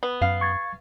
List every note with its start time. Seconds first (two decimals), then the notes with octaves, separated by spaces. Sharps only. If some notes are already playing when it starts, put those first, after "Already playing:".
0.03 B3
0.21 F#2 F5
0.41 C#6 G#6 A6